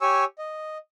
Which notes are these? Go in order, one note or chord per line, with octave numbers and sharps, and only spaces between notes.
G4 C#5 G#5 C#6 E6
D#5